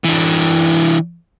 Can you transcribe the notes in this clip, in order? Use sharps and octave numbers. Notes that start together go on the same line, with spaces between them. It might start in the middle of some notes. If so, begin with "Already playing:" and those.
E3 D4